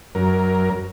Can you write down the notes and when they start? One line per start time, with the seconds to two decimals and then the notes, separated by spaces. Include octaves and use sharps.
0.15 F#2 A#4